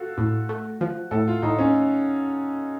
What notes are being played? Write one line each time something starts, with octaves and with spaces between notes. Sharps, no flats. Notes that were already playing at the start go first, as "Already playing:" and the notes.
Already playing: F4 F#4 A4
A2
A3
F3
A2 A4
F4
A2 D#4
C#4